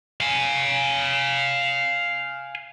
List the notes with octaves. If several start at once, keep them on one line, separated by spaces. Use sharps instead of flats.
F5 G#5